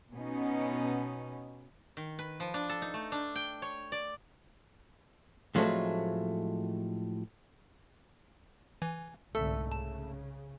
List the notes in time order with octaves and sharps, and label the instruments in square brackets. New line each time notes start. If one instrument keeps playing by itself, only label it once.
[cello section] B2 B3 C#4 D#4
[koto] D#3
B4
F3
D4
A4
D#4
A3
D4
G5
C#5
D5
[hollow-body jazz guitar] A2 F3 F#3 G#3 A3 C4
[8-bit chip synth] E3 [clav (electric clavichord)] G#5
[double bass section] C2 G#2 D3 [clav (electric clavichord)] A3 E5 [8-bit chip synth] A4
[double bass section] C#3 [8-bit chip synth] A5